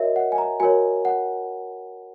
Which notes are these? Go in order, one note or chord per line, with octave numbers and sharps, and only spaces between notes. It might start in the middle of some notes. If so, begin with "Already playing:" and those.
Already playing: F#4 A#4 C#5 D#5 E5
F#5
G#5
A#5
F#4 A#4 C#5 G#5
F#5